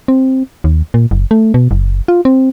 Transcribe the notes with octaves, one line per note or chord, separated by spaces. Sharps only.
C4
D#2
A#2
F#1
A3
B2
F#1
F4
C4